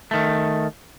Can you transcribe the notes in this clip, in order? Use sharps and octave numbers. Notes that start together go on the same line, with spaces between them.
D#3 A3